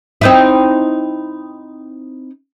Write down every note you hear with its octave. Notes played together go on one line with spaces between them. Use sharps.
C4 D#4 E4